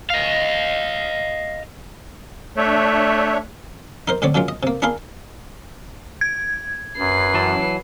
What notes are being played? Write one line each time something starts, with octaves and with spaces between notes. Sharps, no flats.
D#5 F5
A3 D4 C#5 E5
D#4 A#4 C5
A2 D3 C4 C#5 D5
A#2 C#3 F#3 G#3 F4
D#5
C3 A#3
D4 E4 G#4 A#4 F5 C6
G#6
F#2 B4 C7
E3 F#3 A5